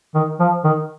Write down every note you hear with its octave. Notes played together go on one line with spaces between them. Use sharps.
D#3
F3
D#3